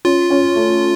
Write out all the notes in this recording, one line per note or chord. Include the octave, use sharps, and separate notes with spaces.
C#4 F4
C#4
A3